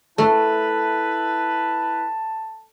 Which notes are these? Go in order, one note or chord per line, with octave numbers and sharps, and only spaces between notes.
A3 E4 B4 A5